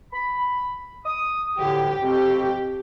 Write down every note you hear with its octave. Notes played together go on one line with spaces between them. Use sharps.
B5
D#6
D2 A2 D3 G4
F2 B2 C4 G4